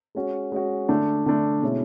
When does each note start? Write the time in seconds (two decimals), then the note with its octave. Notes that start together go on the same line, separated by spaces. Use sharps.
0.15 G#3 C#4 F#4
0.52 G#3 C#4 F#4
0.89 D3 A3 D4
1.26 D3 A3 D4
1.62 B2 G#3 C#4 E4